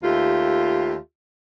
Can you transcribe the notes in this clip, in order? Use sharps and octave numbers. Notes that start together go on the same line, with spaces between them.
D#2 A3 F4 G4